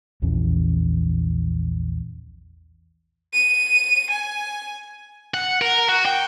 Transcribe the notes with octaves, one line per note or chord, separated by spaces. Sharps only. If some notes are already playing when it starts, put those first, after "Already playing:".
A#1 E2 E3 C#4
D#7
G#5
F#5
A#4
F#4
G5